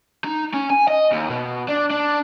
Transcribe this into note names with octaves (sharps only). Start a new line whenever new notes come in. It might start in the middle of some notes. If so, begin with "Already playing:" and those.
D#4
C#4
G#5
D#5
D#2
B2
D4
D4